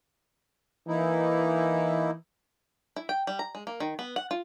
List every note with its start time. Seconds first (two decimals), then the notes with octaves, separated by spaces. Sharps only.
0.88 E3 A#3 D#4 E4
2.96 E4
3.09 G5
3.27 G3
3.39 A#5
3.55 G#3
3.67 A#3
3.80 D#3
3.99 B3
4.16 F#5
4.31 F4